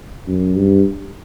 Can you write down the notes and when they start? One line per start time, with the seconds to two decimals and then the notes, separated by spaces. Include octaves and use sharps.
0.27 F#2
0.56 G2